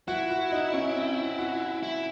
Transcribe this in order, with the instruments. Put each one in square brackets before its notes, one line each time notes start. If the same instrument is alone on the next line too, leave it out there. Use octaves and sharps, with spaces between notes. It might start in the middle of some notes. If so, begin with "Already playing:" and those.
[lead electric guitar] E4 [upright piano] F#4
[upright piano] F#4
D#4
C#4
C4
F#4
[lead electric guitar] E4